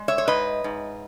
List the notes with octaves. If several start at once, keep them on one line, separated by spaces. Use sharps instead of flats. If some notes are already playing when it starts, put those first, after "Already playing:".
Already playing: G#3
C#5 E5
C#5
G#2 B4 D#5
G#2